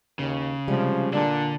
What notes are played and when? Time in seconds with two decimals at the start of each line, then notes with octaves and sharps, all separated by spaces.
0.19 D#2 C#3
0.68 C3 F3 G3 G#3
1.13 A#2 D3 D4